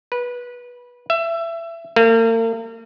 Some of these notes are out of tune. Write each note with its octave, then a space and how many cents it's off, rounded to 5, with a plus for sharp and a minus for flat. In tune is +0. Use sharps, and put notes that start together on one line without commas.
B4 -20
E5 +25
A#3 -40